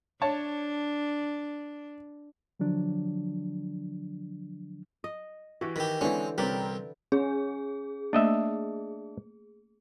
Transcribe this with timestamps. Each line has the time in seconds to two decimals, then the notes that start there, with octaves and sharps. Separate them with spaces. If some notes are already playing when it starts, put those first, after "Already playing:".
0.22 D4 C#5 A5
2.60 D3 F3 F#3 D4
5.04 D#5
5.61 E3 F#4 G4
5.76 D#3 G4 B4
6.01 D3 E3 G#3 C4 C#4
6.38 C2 C4 C#4 G4 A#4 B4 D5
7.12 C#4 G#4
8.13 A3 A#3 D4 D#5 E5